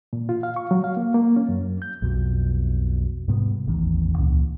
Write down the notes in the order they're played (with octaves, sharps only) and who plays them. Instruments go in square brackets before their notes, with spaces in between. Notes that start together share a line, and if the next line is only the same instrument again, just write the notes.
[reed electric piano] A#2
F4
F5
C#6
F#3
F5
A#3
A#3
C#4
F#2
G6
[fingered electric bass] B1 F2 B2
G#2 C3 G3 B3
D1 A1 E2 D#3
C#2 A#2 C#3 E3